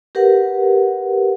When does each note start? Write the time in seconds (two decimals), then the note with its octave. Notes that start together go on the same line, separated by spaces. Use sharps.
0.15 G4 A#4 B4 F#5